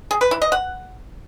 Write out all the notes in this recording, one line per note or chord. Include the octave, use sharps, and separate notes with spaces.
G#4
B4
E4
D#5
F#5